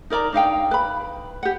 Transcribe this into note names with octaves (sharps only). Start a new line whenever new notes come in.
D#4 A#4 D5 A#5
D4 D#4 F5 G5
B4 B5
G4 F#5